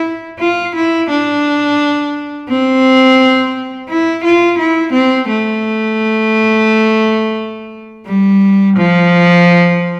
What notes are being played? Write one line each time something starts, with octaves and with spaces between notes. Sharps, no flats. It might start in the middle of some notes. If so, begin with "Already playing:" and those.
Already playing: E4
F4
E4
D4
C4
E4
F4
E4
C4
A3
G3
F3